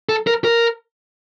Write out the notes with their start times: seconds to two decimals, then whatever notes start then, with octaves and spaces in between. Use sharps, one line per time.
0.09 A4
0.27 A#4
0.44 A#4